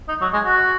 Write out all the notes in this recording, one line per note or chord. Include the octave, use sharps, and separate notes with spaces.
D#4
F#3
G#3
F#4